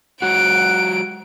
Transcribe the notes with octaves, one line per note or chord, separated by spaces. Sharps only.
F#3 G#3 F#4 F#5 D7